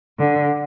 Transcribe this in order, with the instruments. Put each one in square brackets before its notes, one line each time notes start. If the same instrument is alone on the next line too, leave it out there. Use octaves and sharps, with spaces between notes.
[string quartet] D3